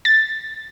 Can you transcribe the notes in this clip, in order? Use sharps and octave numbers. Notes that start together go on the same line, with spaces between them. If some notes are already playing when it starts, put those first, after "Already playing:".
A6